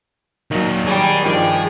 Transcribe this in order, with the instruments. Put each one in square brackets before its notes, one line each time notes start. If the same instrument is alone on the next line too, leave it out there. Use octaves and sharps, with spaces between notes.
[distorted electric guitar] D#2 A#2 [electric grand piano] D#3 F#3
[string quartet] G3 [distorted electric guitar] G#4
[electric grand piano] G2 D#3 F3 [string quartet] G4